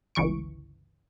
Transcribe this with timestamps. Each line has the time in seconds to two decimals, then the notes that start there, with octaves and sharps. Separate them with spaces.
0.15 G1 C#2 E3 C#6 D7